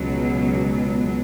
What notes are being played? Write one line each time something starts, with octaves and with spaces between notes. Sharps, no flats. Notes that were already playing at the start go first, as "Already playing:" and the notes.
Already playing: C#2 B2 F#3